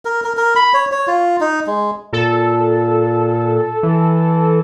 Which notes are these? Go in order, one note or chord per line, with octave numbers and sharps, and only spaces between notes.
A#4
A#4
A#4
B5
C#5
C#5
F4
D#4
G#3
A#2 A4
E3